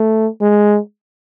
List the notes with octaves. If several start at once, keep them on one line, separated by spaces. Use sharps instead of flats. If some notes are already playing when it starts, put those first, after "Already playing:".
Already playing: A3
G#3